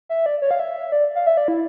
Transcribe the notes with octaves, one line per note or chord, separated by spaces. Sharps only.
E5
D5
C#5
F5
E5
D5
F5
E5
D5
E4